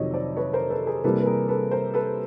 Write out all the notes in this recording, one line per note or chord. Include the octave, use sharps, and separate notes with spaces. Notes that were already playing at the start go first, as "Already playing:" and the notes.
Already playing: F2 C3 D#3 F#3 C#5 D#5
C5 D5
B4 C#5
A#4 C5
A4 B4
G#4 A#4
C3 E3 G3 A#3 A4 B4
B4
G#4 A#4
A4 B4
A#4 C5
A4 B4